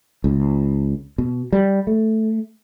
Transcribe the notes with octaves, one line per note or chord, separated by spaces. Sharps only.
C#2
B2
G3
A3